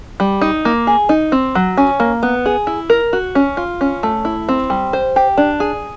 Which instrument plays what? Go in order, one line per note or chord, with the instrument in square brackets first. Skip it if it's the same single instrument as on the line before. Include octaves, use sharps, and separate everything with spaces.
[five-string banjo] G3
D#4
A#3
G#4
D#4
C4
F#3
C#4
A#3
B3
G#4
E4
A#4
F#4
C#4
F4
C#4
A3
E4
C4
G3
C5
G4
D4
G#4